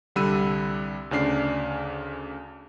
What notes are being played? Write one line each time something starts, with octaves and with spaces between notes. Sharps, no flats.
C2 D3 G3 B5 E6 D#7
D2 C#3 D4 C7